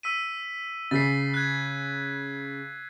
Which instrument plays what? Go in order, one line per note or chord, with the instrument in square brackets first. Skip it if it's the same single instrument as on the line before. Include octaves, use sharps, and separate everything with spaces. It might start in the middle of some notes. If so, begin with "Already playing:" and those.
[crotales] E6 B6 D#7
[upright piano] C#3 [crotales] A6 B6 C7
[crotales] F#6 G#6